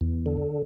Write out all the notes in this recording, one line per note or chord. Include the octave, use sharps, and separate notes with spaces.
E2
D3